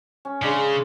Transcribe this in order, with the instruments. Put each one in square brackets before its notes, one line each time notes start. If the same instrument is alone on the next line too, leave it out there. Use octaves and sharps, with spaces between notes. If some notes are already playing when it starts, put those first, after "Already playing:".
[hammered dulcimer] C#4
[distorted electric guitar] C#3 [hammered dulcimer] G#3 D4